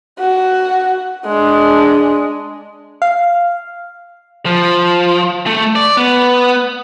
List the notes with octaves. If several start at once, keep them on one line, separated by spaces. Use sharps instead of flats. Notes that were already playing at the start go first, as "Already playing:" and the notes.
F#4
G#3 D4
F5
F3
A3
D5
B3